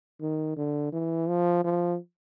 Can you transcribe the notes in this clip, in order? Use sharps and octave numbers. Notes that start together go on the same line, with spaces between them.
D#3
D3
E3
F3
F3